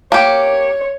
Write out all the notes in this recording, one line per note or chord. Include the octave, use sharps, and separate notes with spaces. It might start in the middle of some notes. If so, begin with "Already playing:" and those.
A#3 G4 C#5